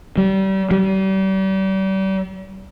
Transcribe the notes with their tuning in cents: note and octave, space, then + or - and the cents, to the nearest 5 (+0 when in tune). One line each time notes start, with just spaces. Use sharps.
G3 -30
G3 -35